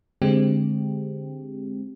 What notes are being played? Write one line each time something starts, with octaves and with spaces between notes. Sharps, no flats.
D3 G#3 C4 G4